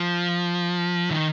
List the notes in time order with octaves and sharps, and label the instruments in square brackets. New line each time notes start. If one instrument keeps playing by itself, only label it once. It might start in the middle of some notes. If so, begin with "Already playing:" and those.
Already playing: [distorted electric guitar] F3
D#3